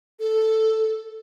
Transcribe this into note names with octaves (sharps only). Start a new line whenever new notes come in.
A4